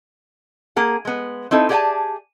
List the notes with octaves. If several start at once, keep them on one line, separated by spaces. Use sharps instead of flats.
A#3 G#4 F#5
G#3 B3
C4 D#4 E4 A4
G4 G#4 D5 F#5 G#5 A5